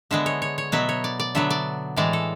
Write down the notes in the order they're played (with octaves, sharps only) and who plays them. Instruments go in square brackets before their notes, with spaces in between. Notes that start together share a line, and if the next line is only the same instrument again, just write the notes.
[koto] D3 G#3 B3 E5
C#5
C#5
C#5
B2 F#3 B3 E5
C#5
D5
D5
D3 F#3 B3 E5
D5
A2 E3 G#3 D5
A4